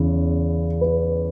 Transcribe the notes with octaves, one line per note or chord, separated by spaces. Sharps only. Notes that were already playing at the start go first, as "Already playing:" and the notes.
Already playing: E2 C#3 E4
B4